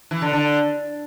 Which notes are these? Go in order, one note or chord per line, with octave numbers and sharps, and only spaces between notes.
E3
D3
D3